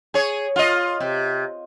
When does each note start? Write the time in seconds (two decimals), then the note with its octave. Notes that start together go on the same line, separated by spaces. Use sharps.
0.14 G#4 C#5
0.56 F4 D#5
1.00 C3